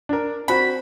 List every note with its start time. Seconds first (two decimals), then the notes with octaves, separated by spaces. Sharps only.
0.09 D4 A#4
0.48 C4 F#4 B5